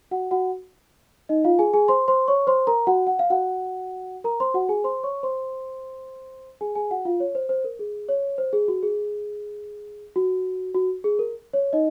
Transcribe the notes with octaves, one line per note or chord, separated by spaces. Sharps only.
F#4 F#5
F#4 F#5
D#4 D#5
F4 F5
G#4 G#5
G#4 G#5
C5 C6
C5 C6
C#5 C#6
C5 C6
A#4 A#5
F#4 F#5
F#5
F5
F#4 F#5
A#4 A#5
C5 C6
F#4 F#5
G#4 G#5
C5 C6
C#5 C#6
C5 C6
G#4 G#5
G#4 G#5
F#4 F#5
F4 F5
C#5
C5
C5
A#4
G#4
C#5
C5
G#4
F#4
G#4
F#4
F#4
G#4
A#4
C#5
D#4 D#5